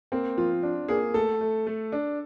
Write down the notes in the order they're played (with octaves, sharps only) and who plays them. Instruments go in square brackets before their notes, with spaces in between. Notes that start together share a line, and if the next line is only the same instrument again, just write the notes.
[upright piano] A#3 [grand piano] C4
[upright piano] F3 [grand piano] F4
[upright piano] D4
[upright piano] A#3 [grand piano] G#4
[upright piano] A3 [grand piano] A4
[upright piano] A3
A3
D4